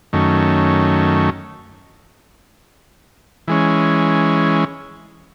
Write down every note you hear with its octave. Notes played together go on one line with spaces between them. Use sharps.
F#2 D#3 A3 C#4
E3 G#3 C#4